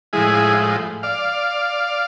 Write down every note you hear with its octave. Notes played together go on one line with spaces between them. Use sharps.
A2 F3 G#3 E4 G#4
D5 F5